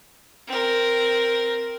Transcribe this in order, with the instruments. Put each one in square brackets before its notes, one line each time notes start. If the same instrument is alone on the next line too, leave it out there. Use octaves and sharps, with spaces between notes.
[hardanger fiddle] C4 A#4